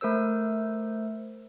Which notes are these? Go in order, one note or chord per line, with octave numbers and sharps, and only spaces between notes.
A3 A#4 C5 E6